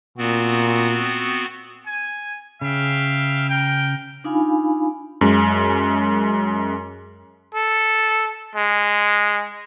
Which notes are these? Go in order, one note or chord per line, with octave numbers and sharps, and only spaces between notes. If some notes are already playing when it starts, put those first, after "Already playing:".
A#2 B3 C4 F#4
G#5
C#3 E5 F5 G5
A#4 G5
D4 D#4 F4 F5 G#5 B5
F#2 G#3
A4
G#3